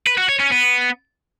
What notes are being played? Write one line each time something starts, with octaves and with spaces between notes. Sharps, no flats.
B4
F#4
C#5
C#4
B3